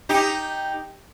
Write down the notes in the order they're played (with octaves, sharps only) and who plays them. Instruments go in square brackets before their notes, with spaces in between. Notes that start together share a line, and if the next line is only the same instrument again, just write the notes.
[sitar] D#4 G4